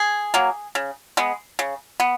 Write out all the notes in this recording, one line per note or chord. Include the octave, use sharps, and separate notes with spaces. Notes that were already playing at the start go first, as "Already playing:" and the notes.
Already playing: G#4
F#3 A#3
C#3
G#3 B3
C#3
B3